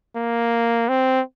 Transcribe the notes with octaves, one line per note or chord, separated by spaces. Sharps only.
A#3
C4